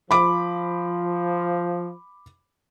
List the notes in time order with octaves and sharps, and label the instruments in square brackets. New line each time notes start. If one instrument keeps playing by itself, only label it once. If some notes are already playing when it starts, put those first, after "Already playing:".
[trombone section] F3 [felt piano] B5 D6